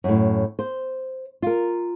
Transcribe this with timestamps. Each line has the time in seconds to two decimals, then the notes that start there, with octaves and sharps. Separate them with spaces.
0.04 F#2 A2
0.59 C5
1.42 F4 A#4